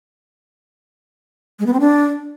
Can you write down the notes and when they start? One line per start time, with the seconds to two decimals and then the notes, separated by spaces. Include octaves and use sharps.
1.60 G#3
1.66 B3
1.73 C4
1.80 D4